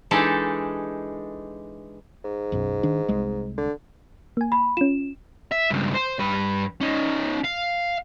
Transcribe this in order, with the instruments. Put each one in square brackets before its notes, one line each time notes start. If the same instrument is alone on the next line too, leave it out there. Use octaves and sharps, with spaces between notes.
[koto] E3 G#3 D4 D#4 G4 A4
[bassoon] G#2
[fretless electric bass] B1 F#2 B2
D#3 D4
C2 G#3
[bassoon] D3
[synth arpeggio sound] A#3 G#5
[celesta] B5
[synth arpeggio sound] C#4 F4 [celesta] E7
[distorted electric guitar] E5
C#2 G2
C5
G2 B4
C#4 D#4
F5